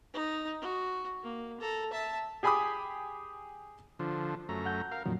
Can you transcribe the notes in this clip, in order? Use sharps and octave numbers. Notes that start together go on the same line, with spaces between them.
D#4
F#4
A#3
A4 A#5
E5 A5
G4 G#4 G#5 B5 D6 D#6
D3 F3
F#2 A3 A#5
F#5 G6
A#4 F5
F2 A#2 D#3 F#3